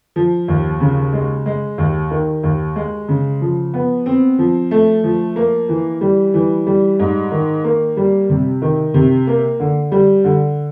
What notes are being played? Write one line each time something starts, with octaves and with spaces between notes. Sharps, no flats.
F3
D#2
C#3
G#3
G#3
D#2
D#3
D#2
G#3
C#3
F3
B3
C4
F3
A3
F3
A#3
E3
G3
E3
G3
G#2
D#3
A#3
G3
C3
D#3
C3
A#3
D3
G3
D3